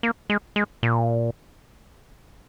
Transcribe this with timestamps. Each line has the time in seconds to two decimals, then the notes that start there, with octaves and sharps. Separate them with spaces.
0.03 A#3
0.30 G#3
0.56 G#3
0.83 A#2